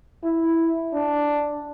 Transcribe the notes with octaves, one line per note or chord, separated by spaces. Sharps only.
E4
D4